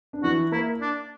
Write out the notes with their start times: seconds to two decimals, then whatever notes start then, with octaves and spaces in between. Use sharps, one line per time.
0.13 D4
0.23 E3 E4 F#4
0.52 A#3 E4 A#4
0.81 D4